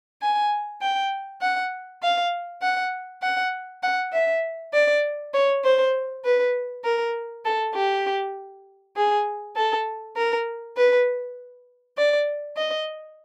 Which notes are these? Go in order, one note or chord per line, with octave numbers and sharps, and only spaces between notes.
G#5
G5
F#5
F5
F#5
F#5
F#5
E5
D5
C#5
C5
B4
A#4
A4
G4
G#4
A4
A#4
B4
D5
D#5